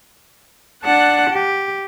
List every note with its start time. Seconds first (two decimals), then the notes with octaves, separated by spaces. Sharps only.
0.85 D4 F#5 A5 F#6
1.29 G4